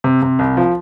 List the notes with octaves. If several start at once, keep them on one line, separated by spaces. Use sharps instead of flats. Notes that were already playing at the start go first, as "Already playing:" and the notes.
C3
C3
C2
F3